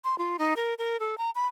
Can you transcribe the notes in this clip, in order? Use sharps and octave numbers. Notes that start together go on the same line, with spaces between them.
C6
F4
D#4
A#4
A#4
A4
A#5
B5